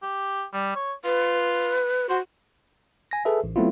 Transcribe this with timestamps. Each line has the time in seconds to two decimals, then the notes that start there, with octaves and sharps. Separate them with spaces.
0.03 G4
0.53 G3
0.75 C#5
1.05 F4 B4
2.09 F#4 C5
3.11 G#5 A#6
3.25 G#4 A4 B4 E5
3.44 A1
3.56 F#3 A3 B3 C4 E4 F4